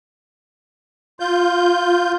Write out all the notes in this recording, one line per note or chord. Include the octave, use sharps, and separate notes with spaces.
F4 G6